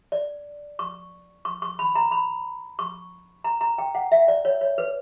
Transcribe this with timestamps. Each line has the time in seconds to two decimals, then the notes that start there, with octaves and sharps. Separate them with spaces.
0.12 D5
0.79 C#6
1.45 C#6
1.62 C#6
1.79 B5
1.95 A#5
2.11 B5
2.79 C#6
3.44 A#5
3.61 A#5
3.78 G5
3.95 F#5
4.12 E5
4.28 D5
4.45 C#5
4.61 C#5
4.78 B4